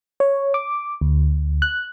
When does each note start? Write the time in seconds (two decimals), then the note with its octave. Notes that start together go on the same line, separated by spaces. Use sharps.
0.20 C#5
0.54 D6
1.01 D2
1.62 F#6